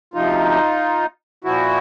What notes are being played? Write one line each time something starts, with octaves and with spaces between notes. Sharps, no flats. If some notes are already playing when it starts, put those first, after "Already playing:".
D2 C3 F3 D#4 F4
A#2 F3 E4 F#4